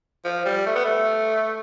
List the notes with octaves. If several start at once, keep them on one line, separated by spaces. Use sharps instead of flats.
F3
G3
A3
B3
A3